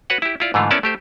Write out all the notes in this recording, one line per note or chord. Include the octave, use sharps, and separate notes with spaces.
F#4 B4 C#5 F#5
E4 G4
E4 F4 D5
G#2 D3 E3 A3 F4
B3 C#4 E4 A#4 D5 A5
A3 G4 C5